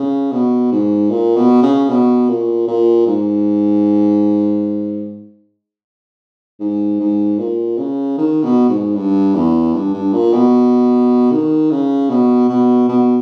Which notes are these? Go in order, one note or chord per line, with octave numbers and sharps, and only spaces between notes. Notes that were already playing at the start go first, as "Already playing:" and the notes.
Already playing: C#3
B2
G#2
A#2
B2
C#3
B2
A#2
A#2
G#2
G#2
G#2
A#2
C#3
D#3
B2
G#2
G2
E2
G2
G2
A#2
B2
D#3
C#3
B2
B2
B2